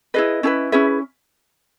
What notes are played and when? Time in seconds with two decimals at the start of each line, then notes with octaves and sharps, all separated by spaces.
0.14 E4 G#4 B4 D#5
0.43 C#4 E4 G#4 B4
0.72 C#4 E4 G#4 B4 E5